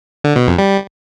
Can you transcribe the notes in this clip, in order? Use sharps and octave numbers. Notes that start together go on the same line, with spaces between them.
D3
B2
F2
G3